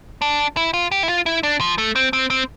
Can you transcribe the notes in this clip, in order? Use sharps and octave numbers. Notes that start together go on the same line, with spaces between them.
D4
E4
F4
G4
E4
F4
E4
D4
F3
A3
C4
C4
C4